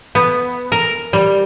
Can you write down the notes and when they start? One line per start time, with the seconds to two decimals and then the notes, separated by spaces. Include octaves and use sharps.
0.15 B3
0.72 A#4
1.13 G3